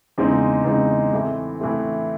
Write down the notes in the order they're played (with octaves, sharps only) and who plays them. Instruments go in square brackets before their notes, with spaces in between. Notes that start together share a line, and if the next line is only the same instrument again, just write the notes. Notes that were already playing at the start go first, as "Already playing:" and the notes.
[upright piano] E2 C#3 G#3 C4 D#4
E2 C#3 G#3 C4 D#4
A2 E3 A3 C4
A2 E3 A3 C4